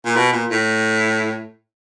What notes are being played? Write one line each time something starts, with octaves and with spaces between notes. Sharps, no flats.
A#2
B2
A#2
A2